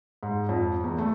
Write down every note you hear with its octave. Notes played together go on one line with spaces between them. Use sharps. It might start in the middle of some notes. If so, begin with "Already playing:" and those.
G#2
F2
E2
A3